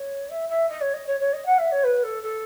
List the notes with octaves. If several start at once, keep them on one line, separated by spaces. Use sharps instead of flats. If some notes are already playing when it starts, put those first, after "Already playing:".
Already playing: C#5
E5
E5
D#5
C#5
D#5
C#5
C#5
D#5
F#5
E5
C#5
B4
A4
A4